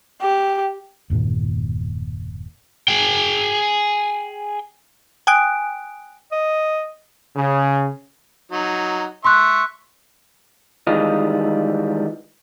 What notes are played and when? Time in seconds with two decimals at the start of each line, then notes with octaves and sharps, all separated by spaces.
0.22 G4
1.10 E1 G2 A#2 D#3
2.88 G#4 G5
5.27 G5 G#5 D#6 F#6 D7
6.32 D#5
7.36 C#3
8.52 F#3 D#4
9.25 E5 C6 C#6 F#6
10.87 D#3 E3 G3 G#3 F4 D#5